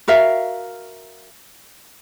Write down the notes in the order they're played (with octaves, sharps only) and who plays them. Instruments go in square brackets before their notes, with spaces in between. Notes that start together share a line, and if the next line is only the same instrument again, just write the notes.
[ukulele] F#4 A#4 E5 F5